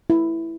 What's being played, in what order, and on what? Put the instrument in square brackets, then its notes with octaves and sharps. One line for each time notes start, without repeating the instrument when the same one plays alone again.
[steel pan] E4